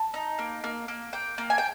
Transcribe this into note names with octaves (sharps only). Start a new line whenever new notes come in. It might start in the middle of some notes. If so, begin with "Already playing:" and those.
Already playing: A5
D#4
A#3
A#3
A#3
A#3 G5
A#3
G#5
G5